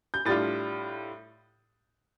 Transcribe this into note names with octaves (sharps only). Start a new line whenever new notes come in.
G6
A2 G3 D4 F4 A6